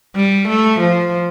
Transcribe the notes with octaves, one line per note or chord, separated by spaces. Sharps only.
G3
A3
F3